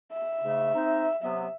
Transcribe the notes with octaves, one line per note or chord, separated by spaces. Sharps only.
E5
G#2 C#3 A3
C4 D#4
C3 F#3 B3 E5